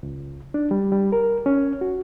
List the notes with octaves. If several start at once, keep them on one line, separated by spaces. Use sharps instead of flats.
C#2
D4
G3
G3
A#4
C#4
F#4